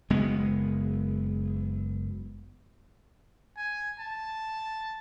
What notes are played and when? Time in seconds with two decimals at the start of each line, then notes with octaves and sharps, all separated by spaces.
0.10 F#1 G#3 B3
3.57 G#5
3.99 A5